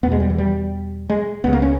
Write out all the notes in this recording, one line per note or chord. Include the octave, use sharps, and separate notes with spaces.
E2 B2 G#3 B3
G3
E3
G3
G#3
C#2 C#3 B3
A#3
C#4